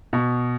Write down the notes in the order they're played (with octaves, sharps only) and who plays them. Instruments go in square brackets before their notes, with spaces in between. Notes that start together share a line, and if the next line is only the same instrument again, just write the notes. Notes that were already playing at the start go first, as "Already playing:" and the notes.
[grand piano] B2